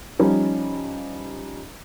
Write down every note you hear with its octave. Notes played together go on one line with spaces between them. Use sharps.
F3 G3 C#4 D#4